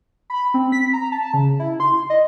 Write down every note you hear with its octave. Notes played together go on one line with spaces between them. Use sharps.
B5
C4
B6
A#5
A5
C#3
E4
C6
D#5